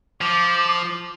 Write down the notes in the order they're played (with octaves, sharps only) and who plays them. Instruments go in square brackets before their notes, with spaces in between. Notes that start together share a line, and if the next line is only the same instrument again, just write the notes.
[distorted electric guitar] F3 [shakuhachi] D6